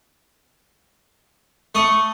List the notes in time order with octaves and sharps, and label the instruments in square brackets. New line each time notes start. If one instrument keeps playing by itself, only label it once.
[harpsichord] A3 D#6 [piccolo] C#6